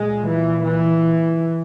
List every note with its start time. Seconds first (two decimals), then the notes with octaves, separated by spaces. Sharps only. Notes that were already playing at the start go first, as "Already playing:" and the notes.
Already playing: A#2 G#3
0.28 E3
0.66 E3